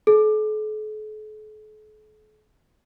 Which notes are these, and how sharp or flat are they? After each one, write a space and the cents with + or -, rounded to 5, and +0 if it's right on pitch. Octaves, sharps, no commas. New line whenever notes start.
A4 -45